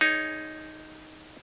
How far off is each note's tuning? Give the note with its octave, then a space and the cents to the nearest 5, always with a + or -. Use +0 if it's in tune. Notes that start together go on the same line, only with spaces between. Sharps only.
D#4 +0 G#4 +0 C#5 +15